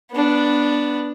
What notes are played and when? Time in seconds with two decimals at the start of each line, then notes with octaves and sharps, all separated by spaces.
0.12 B3 D4